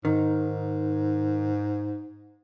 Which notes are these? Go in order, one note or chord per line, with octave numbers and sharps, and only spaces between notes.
G#2 D#3